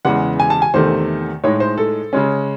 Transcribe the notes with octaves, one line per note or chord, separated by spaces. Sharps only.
E2 C#3 E3 G#3 F#5
G#5
A5
G#5
E2 C3 D#3 A3 C5
A2 G#3 D#4 C#5
C5
A4
C#3 G#3 C#4